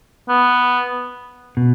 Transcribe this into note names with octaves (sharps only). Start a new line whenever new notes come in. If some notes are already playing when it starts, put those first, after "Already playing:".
B3
B2